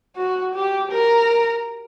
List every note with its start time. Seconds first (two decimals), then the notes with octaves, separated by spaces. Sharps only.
0.16 F#4
0.55 G4
0.92 A#4